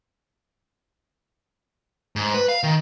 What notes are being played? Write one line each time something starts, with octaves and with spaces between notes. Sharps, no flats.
G#2
B4
F5
D#3